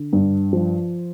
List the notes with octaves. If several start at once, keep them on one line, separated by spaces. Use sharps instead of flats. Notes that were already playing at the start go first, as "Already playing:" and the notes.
Already playing: D3
G2
F3